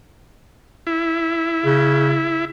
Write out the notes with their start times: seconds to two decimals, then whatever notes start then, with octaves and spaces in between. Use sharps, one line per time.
0.87 E4
1.65 C#3